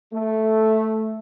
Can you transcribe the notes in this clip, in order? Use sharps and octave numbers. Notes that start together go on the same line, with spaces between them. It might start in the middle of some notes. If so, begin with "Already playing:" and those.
A3